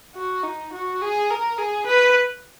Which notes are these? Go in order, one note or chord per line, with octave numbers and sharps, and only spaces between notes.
F#4
D#4
F#4
G#4
A#4
G#4
B4